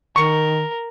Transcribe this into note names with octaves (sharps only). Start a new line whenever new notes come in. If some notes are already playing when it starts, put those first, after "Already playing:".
D#3 A#4 C#6